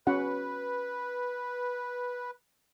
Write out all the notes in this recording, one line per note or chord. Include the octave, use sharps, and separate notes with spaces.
C#4 F#4 B4 F#5